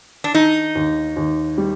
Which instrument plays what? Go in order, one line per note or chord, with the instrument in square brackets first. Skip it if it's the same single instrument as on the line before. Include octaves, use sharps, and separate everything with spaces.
[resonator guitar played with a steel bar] D4
[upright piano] D#3 [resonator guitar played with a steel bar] D#4
[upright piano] D#2
D#2
G3